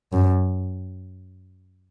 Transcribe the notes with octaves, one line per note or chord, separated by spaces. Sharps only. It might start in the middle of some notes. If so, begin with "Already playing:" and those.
F#2